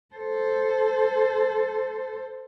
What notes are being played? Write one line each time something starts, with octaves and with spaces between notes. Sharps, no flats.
A4 C5